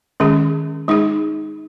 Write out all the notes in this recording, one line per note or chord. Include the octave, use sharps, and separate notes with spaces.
D#3 G#3 C#4 G#4
G#3 D#4 G#4